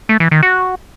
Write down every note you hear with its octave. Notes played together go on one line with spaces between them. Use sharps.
A3
E3
D#3
F#4